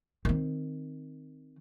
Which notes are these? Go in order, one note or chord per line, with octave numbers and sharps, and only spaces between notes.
D#3 C4